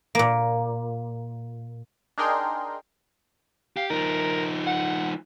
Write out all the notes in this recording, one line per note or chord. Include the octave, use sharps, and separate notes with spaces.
A#2 A#3
D4 D#4 G#4 A#4 G5 C6
G4 F5
F3 D#4 A#4
F#5